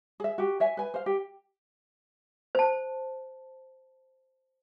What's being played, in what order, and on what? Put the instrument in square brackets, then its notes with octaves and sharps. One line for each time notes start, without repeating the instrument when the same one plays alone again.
[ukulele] G#4 E5
F#4 G4
C#5 E5 G#5
B4 G#5
C5 F5
G4
[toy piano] C5 A5